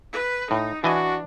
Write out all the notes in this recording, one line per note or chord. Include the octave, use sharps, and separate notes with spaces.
B4
A2 D#4
E3 D4 F#4 D#5 G#5